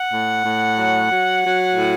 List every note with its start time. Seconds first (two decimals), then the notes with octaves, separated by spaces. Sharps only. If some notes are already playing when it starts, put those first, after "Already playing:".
Already playing: F#5
0.12 A2
0.44 A2
0.77 F#3
1.09 F#3
1.42 F#3
1.75 A2